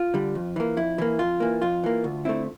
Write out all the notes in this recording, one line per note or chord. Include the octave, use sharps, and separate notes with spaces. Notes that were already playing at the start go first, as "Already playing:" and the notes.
Already playing: F4
D3 G3
F2
E3 A#3
F2 E4
E3 A#3
F2 F4
E3 A#3
F2 F4
E3 A#3
D2
D3 A3 C4 E4